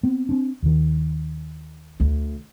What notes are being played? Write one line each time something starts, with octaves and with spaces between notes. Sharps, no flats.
B3 C4
C4 D4
D#2 D#3
D2